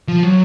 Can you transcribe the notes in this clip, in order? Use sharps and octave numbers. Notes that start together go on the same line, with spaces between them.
F3
F#3